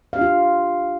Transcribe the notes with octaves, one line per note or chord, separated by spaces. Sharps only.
D4 F4 G4 F5